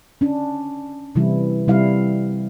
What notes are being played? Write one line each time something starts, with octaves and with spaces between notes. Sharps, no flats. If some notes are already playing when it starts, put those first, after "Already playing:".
C#4 D4
C3 E3 G3 E4
C3 G3 E4 F5